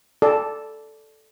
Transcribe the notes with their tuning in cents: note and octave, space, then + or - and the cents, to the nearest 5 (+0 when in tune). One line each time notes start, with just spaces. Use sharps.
A4 +0 D5 -5